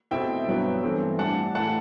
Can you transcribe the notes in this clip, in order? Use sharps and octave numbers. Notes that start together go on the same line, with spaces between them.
B2 A3 C4 E4 E5 G5
G2 F#3 B3 E4
G2 E3 A3 C4
A2 G3 D4 F#5 A5
A2 E3 A3 E4 F#5 A5